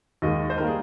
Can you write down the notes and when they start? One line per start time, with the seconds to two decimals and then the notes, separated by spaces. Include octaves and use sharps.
0.22 D#2 D#3 G#3 D#5
0.50 C5
0.58 D#3 G3 A#3 A#4
0.67 G#4